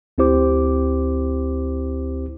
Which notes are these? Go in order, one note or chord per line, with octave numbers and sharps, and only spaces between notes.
D2 C4 E4 G4 C5 D6